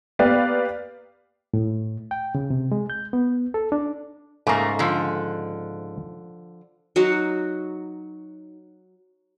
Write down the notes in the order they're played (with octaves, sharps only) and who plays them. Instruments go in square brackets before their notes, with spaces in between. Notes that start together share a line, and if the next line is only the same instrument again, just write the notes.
[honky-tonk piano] A#3 B3 G4 B4 D5 F5
[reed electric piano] A2
G5
C#3
C3
G#3
G6
B3
A4
D4
[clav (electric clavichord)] G#2 C#3 [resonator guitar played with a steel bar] A3 A#3
[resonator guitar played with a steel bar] D3 F3
[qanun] F#3 D#4 F#4